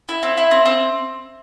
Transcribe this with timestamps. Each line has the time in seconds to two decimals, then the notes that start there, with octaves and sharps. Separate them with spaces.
0.09 E4
0.23 C4
0.38 E4
0.51 C4
0.66 C4